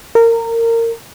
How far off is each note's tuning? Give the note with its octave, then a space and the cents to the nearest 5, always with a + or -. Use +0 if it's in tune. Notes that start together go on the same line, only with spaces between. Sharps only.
A#4 -25